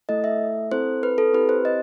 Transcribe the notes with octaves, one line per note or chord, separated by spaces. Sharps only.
A3 E4 A4 D#5
E5
C4 E4 A4 C5
B4
A4
C4 E4 G4 B4
C5
D#5